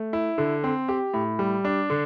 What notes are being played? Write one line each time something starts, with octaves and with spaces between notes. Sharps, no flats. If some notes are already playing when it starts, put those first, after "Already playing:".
Already playing: A3
E4
D3
C4
G4
A2
G3
D4
D3